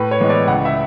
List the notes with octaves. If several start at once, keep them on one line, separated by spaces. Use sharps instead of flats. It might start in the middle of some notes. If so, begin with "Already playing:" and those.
Already playing: A2 B4
C#5
E3 G#3 B3
D5
C#2 F#5
E5